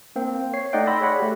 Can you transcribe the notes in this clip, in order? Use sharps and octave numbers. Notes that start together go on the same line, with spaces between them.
A#3 C4
C#5 C7
A3 D#4 D5 D#5 F#5 G5
B5 C6 E6 A#6
G#4 C#5 D5 F#5 B5
A3 G4